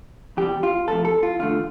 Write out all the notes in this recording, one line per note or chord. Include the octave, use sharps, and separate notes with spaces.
E2 C3 G3 G4
F4
E2 C3 F3 A3 A4
A4
F4
E2 D3 A3 F4